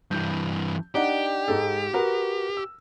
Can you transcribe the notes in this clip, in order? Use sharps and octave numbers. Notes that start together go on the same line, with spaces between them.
G2 E3 G6
D4 D#4 G4 F#5
G#2 G#3 A4
F#4 A#4 B4
E6